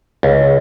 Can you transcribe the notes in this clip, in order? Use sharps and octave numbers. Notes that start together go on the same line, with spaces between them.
C#2